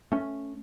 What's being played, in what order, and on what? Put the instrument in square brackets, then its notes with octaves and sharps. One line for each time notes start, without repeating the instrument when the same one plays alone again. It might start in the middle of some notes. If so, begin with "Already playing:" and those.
[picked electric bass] A3 C#4